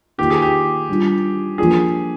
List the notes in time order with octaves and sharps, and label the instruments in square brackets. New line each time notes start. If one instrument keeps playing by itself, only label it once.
[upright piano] D#3 A#3 F4 [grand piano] G4
[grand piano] G#4
G4
[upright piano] G3 D4 F4
[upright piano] F3 A#3 D4 F4 [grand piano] G#4